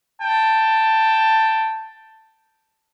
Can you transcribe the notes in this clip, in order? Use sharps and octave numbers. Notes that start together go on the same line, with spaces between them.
G5 A5